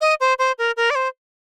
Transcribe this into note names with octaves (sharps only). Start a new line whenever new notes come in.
D#5
C5
C5
A#4
A#4
D5
C5